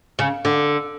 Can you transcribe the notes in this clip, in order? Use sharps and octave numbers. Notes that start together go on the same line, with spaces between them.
C#3
D3